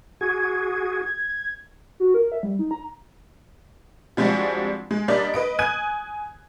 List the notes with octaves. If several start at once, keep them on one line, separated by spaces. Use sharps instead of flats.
F#4 G#4 G#6
F#4
A#4
E5
G3
D#4
A#5
F3 G3 G#3 C4 D4 F#4
G#3
G3 A#3 D4 D5 D#5
B4 D#5 D7
G#5 D#6 F#6 G#6 D#7